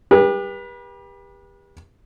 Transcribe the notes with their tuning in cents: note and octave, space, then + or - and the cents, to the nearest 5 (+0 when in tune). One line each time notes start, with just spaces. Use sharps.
G4 +30 B4 -35